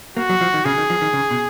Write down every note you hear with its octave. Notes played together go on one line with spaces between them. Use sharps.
A#3 F#4
F#3
F3
D#3
C#3 G#4
D#3
F3
D#3
C#3
B2